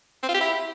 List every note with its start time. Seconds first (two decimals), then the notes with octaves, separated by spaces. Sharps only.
0.23 C4
0.29 F4
0.35 G4
0.41 E4